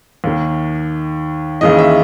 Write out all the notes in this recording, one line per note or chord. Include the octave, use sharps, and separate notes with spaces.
D#2 D#3
D#2 C#3 E3 D#5
E5